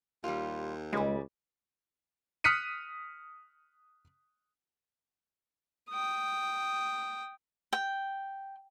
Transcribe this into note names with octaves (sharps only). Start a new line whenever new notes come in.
D#2 G3 F4
C#2 C#3 G3 G#3
D#6 F6 F#6 B6 C#7 D#7
G5 D#6
G5